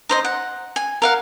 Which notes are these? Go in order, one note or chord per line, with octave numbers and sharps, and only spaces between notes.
D#4 C5 D#5
F#5
G#5
A#4 F5 F#5